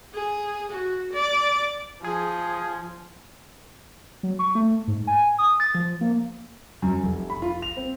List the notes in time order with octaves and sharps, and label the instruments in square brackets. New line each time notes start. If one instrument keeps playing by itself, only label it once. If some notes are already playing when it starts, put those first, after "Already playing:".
[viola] G#4
F#4
D5
[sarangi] F3 [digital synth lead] G#4
[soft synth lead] F#3
C#6
A3
G#2
G#5
D#6
A6
F3
A#3
[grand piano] F#2
F1
B5
F4
F7
C4